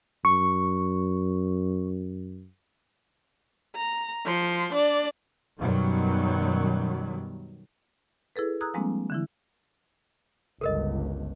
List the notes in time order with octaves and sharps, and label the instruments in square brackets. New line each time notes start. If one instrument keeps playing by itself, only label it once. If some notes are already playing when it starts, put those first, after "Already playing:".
[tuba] F#2 [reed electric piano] C#6
[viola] A#5
F3 C6
D4 D5
[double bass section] F#2 B2 D#3 F#3 G3
[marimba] E4 G#4 A4 B4
A#5 D#6 E6 F#6 G#6
F3 G3 G#3 A#3 C4 D4
D3 E3 E4
[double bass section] G1 C#2 G2 [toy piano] A4 A#4 D#5